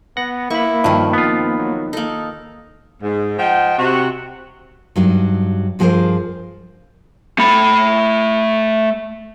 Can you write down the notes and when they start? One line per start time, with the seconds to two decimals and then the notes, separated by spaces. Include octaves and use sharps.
0.17 B3 F#5 A#6
0.50 A#3 E4 B5 C#6
0.84 G2 D#3 F3
1.13 B3 C4 F4
1.58 F#3
1.93 A#3 D#4 A4
3.03 G#2
3.38 F3 D#5 F#5 G5
3.78 C3 F#4
4.96 G2 F#3 D#4
5.79 G2 F3 F#4 G#4 A#4 C5
7.38 A3 B5